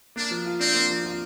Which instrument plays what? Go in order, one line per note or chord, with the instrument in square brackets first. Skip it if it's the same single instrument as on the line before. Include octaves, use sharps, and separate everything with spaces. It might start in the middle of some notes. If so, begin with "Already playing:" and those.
[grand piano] A#3 [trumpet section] D4
[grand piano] F3
F4
[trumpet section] C4 [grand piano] D4
[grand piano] A#3
F3
F4